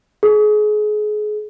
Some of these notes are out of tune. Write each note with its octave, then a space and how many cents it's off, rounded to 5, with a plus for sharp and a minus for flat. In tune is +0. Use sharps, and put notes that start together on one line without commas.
G#4 +30